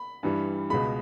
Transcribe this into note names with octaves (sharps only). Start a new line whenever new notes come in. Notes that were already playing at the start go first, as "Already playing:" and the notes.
Already playing: B5
G2 E3 G3
C#2 B2 G#3 B5